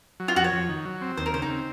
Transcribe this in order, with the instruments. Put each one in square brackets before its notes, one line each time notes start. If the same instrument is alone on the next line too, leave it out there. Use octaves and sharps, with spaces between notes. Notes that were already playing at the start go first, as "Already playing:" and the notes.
[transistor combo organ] F#3
[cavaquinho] F4
[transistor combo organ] F2 [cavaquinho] F#4
[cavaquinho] C#5
[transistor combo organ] F2
D#3
F#3
C4
[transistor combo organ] D#2 [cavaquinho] C5
[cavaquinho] A#4
[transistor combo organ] C#3 [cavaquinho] C5
[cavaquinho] D#4
[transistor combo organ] C4